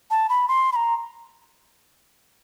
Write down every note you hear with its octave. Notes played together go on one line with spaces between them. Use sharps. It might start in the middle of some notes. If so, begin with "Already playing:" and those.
A5
B5
C6
B5
A#5